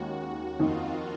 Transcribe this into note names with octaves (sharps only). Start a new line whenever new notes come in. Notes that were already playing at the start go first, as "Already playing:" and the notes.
Already playing: D#2 D#3 G#3 C#4 F#4
F2 D#3 A#3 D#4 F4